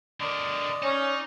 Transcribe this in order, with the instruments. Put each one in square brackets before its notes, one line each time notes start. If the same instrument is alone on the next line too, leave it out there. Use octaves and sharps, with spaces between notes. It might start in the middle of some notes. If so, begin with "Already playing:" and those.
[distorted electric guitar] D3 A#4 [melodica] D5 D#5
[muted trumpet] C#4 [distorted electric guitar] D#4